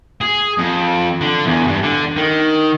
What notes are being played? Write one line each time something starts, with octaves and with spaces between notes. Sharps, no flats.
G#4
F2
D3
E2
G2
D3
D#3